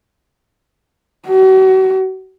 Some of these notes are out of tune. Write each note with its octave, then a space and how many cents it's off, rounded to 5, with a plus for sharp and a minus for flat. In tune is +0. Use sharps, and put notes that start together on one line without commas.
F#4 +40